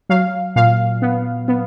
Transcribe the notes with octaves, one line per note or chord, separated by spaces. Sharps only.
F#3 F5
A#2 F5
B3
B3